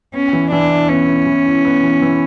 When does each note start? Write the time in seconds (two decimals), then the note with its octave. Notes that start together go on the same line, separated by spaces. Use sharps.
0.14 B3 C#4
0.33 E3
0.52 E3 D4
0.71 E4
0.89 B3 C#4
1.08 E3
1.27 E3
1.46 E4
1.65 B3
1.83 E3
2.02 E3